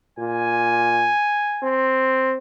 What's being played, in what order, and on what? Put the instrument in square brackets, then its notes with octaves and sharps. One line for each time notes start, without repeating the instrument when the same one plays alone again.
[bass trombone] A#2 [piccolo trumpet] G#5
[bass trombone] C4